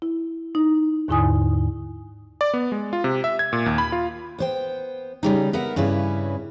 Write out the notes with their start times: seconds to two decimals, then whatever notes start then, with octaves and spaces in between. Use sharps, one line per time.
0.02 E4
0.55 D#4
1.08 D#2 G#2 D3 E4 G#5 D#6
2.41 D5
2.54 B3
2.72 G#3
2.93 F4
3.04 C3
3.24 E5
3.39 G#6
3.53 A#2
3.66 D#2
3.78 B5
3.92 F4
4.38 B3 C5 G5
5.23 C#3 G3 D#4
5.53 B3 A#4 E5 F#5
5.76 G2 C#3 C#4 E4 B4